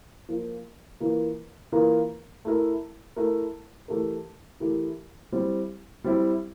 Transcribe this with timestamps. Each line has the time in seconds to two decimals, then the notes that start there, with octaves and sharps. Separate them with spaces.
0.29 F3 A#3 F4
1.00 E3 A#3 F4 A#4
1.72 E3 A#3 F4 A#4
2.45 A3 E4 A#4
3.16 A3 E4 A#4
3.88 E3 A3 E4 G4 A#4
4.60 E3 A3 E4 G4 A#4
5.32 G3 C4 E4
6.04 G3 C4 E4